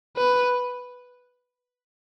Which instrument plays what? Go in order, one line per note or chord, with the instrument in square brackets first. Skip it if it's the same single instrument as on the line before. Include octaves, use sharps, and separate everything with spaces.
[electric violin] B4